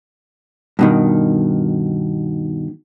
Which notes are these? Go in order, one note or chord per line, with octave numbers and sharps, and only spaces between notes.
G2 B2 D#3